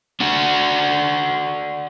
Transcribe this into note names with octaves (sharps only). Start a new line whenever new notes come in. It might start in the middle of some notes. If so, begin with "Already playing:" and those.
D4 F#4